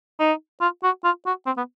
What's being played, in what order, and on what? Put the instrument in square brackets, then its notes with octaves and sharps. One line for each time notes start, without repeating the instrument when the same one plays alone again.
[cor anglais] D#4
F4
F#4
F4
F#4
C4
B3